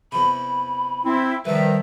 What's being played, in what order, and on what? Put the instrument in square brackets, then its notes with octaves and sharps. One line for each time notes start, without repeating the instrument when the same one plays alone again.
[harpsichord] E2 C3 [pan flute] B5
[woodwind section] C4 E4
[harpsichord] C2 G3 [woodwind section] D#3 F3 E5 [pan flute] B4